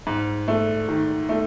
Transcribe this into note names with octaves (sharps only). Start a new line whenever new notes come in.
G#2
A3
D#3
A3